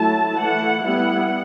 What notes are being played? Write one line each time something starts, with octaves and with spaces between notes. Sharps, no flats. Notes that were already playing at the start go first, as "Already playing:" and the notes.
Already playing: F#3 A3 E4 A5
E3 A3 E4 F#5
G3 B3 E4 F#5